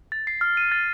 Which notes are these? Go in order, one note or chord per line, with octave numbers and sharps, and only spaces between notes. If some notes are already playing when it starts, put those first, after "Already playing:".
A6
C7
F6
D#7
A6